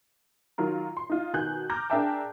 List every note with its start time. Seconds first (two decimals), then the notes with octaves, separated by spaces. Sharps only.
0.58 D#3 F#3 F4 A#4
0.97 C6
1.10 D#4 F4
1.33 B2 D#3 G#5 F#6 G6
1.70 A#5 D6 F6 G6 A#6
1.90 D4 G#4 A#4 E5 G5 A5